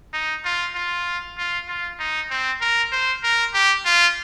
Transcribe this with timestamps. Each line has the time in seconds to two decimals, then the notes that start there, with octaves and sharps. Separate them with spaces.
0.13 D#4
0.45 F4
0.75 F4
1.38 F4
1.68 F4
2.00 D#4
2.30 C4
2.61 A#4
2.92 C5
3.23 A#4
3.54 G4
3.85 F4